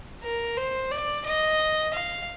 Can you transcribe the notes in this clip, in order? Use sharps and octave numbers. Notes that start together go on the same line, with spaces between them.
A#4
C5
D5
D#5
F5